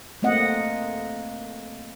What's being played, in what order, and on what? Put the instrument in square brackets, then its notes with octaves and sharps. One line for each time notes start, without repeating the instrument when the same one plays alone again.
[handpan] A3 A#3 C4 D#5 F#5